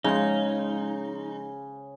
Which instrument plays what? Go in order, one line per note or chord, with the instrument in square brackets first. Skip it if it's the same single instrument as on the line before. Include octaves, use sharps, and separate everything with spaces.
[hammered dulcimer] C#3 [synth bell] F3 G#3 C6 [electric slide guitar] D#4